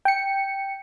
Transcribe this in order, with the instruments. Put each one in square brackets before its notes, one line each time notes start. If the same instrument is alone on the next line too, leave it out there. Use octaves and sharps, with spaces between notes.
[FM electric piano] G5 C#7